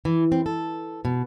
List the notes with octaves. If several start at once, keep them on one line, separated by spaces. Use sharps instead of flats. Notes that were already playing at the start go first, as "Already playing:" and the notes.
E3
C4
A4
B2